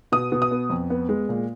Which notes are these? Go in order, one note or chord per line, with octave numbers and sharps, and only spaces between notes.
B2 D#6
B2
D#6
B3
F2
B3
G#3
A#2